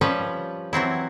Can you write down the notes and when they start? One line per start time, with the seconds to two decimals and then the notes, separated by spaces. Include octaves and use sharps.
0.01 F3 G3 C#4 B4
0.73 E3 F#3 C4 E4